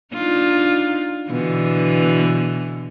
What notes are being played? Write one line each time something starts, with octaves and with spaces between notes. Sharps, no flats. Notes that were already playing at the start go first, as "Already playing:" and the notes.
D4 D#4 F4
B2 D3 E3